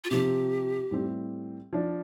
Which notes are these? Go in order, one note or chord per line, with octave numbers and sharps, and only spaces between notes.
F4
C3 F3 C4 G4
A2 G3 C4
F3 D4